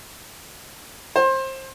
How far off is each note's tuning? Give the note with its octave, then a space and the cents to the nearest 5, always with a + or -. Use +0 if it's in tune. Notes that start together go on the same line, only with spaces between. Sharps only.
C5 +25